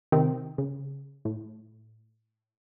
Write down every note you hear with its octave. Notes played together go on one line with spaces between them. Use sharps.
C3 D#3 C4
C#3
A2